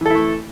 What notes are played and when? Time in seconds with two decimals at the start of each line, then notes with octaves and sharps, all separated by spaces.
0.01 E3
0.06 A4
0.10 E4
0.15 A3